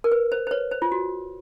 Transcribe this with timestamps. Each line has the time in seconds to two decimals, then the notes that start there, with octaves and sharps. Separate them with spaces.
0.04 A#4
0.12 B4
0.32 C5
0.47 C5
0.51 B4 C#5
0.71 C5
0.82 F4
0.92 F#4